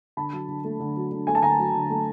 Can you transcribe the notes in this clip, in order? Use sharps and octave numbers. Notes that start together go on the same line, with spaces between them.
D3 A5 B5
F#3
D3
A3
D3
F#3
D3
A3 G#5
A5
D3 G#5 A#5
F#3
D3
A3